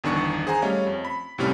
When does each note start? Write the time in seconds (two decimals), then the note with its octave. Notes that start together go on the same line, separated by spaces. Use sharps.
0.04 G1 E2 D#3 D4 C#6 C#7
0.47 G#4 C5 F#5 G#5 A#5
0.62 G3 A3 C#4 C#5 D#5 F5
0.87 F2
1.05 B5
1.38 C2 A2 C3 G3 C#4